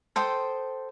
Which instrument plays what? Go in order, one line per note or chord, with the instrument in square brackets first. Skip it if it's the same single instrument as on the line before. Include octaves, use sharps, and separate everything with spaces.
[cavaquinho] A4 C5 G5 D#6